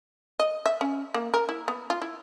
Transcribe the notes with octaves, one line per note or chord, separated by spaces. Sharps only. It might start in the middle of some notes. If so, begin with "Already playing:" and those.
D#5
E5
C#4
A#3
A#4
E4
B3
F4
E4